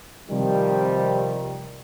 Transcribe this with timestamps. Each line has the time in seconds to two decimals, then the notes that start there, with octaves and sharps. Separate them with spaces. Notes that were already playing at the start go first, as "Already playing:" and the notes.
0.30 C3 D#3 F3 G3